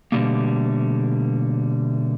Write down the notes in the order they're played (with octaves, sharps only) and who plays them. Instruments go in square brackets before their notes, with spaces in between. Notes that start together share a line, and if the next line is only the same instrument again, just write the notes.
[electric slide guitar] B2 D3 E3 G3 A3 A#3